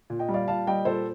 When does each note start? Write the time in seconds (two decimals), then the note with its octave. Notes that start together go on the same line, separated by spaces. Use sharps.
0.10 A#2
0.19 D#5 G5
0.29 G3
0.34 D5 F5
0.48 A#2 F5 A5
0.67 G3 D#5 G5
0.85 A#2 A4 C5